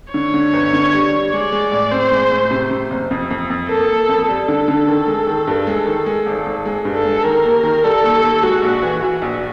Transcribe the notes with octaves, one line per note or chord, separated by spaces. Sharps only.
D3 C#5
D3
G1
D3
G3
G3
G#3 D5
G#3
A2
C4 C5
G#3
A2
C3
C3
F#1
F2
F2
F2
A#3 A4
A#3
F2
G3 A4
D3
D3
D#3
G#3
D#3
G2
G#3
D#3
G#3
G#1
G#1
G#3
G2
A4
G#3
D#3 A#4
D#2
D#3
G3 A4
D#2
D#2
G#3 F#4
A#1
E3
E3 F#4
A#1